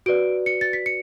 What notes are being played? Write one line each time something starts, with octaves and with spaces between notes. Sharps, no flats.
F#4 B4 D5 D7
C#7
A6
B6
C#7